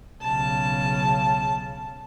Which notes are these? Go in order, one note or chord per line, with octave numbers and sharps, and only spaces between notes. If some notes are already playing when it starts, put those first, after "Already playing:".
B1 C#3 A5